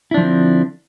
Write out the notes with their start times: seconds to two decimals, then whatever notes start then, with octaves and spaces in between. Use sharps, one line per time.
0.11 E4
0.14 D4
0.17 F3
0.20 D3
0.23 C4